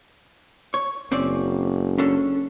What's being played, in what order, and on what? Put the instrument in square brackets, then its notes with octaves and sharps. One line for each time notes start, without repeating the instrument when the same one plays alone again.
[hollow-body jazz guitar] C#5
[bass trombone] F#1 [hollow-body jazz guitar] C4 C#4 D5
[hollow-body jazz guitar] C#4 D4 A4